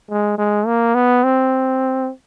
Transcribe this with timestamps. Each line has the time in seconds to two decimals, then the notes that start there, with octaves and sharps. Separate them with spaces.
0.10 G#3
0.38 G#3
0.66 A#3
0.95 B3
1.24 C4